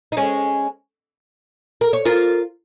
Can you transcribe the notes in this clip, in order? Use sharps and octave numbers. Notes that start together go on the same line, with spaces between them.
D#4
G#3 C#4
A#4
C#5
F4 A#4